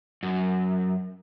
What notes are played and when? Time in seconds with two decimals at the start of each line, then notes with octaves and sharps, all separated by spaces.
0.23 F#2